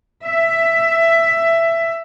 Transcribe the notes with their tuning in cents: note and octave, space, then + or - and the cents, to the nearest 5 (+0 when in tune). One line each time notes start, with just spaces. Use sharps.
E5 +10